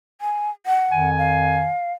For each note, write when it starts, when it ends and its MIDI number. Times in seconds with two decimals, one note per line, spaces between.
0.21 0.50 80
0.66 1.10 78
0.92 1.69 41
0.92 1.69 51
0.92 1.69 80
1.18 1.93 77